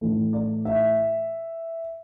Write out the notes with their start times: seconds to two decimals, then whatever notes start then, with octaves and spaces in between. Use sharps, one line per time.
0.01 A2 E3 A3
0.33 D5
0.65 E5